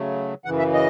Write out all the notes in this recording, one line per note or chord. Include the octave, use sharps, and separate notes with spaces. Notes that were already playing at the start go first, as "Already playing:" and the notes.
Already playing: C#3 F#3 A3
F#2 C#3 E3 F#5
E5
D#5